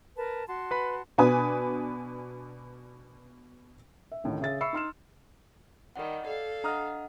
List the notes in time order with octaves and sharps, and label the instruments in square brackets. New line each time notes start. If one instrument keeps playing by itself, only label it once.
[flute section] A#4 B4 A5
F#4 A5 C6
[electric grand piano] B4 B5
[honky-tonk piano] B2 D4 B4 G#5 D#6
[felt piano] E5
A1 D2 A2 D#3
C#3 G#4 E5 A6
E5 B5 C#6 E6 C7 C#7
D#4 C6 F6 E7
[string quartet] D#3 G3 [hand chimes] D#5 F#5
[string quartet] A4 F5 [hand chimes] D5
[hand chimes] D4 D#5 F#5 [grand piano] A#5 D#6 F6